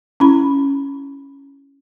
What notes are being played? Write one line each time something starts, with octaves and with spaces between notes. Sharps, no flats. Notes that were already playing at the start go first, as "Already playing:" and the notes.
C#4 E4 B5